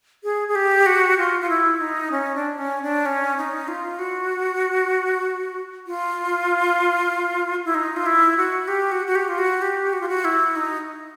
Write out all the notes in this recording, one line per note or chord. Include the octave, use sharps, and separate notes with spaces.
G#4
G#4
G4
F#4
F4
F4
E4
D#4
C#4
D4
C#4
D4
C#4
D#4
F4
F#4
F4
E4
D#4
F4
E4
F#4
G4
F#4
F#4
G4
F4
F#4
G4
F#4
F4
F#4
E4
D#4